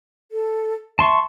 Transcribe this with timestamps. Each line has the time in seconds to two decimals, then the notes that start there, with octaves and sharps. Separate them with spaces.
0.32 A4
0.99 E5 A5 C6 C#6